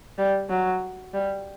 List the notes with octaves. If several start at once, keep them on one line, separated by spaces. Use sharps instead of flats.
G3
F#3
G3